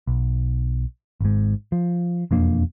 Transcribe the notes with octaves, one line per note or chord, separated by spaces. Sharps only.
B1
G#1 G#2
F3
E1 F2 A#3 D4